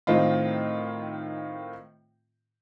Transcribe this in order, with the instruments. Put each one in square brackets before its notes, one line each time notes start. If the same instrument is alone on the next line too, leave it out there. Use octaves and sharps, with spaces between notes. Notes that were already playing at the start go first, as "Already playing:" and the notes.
[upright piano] A2 D#3 C4 D#4 F4